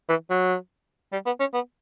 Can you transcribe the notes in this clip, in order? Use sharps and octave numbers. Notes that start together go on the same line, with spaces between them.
E3
F#3
G3
B3
C#4
B3